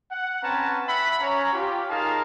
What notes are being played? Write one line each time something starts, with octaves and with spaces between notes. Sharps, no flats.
F#5
C4 C#4 B4 G5 A5 A#5
E5 F#5 B5
C#4 C#5 A#5
F4 G4
D#4 F4 G#4 A#4 F5 A5